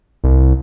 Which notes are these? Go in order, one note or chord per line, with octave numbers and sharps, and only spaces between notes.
C2